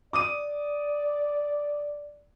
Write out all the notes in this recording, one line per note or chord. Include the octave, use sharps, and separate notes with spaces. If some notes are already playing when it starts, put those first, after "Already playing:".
D5 D6 D#6 D#7